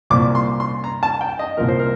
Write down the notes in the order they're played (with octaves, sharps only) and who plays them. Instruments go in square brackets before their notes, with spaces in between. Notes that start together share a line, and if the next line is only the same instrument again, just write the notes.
[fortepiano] C2 A#2 F3 D6
C6
C6
A#5
A5
G5
D#5
C2 A#2 F3 A#4
C5
A#4